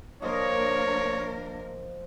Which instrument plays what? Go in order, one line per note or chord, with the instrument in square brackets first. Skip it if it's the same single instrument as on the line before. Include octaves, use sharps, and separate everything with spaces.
[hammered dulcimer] F3 D#5 [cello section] A#3 D4 A#4 [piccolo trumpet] C#5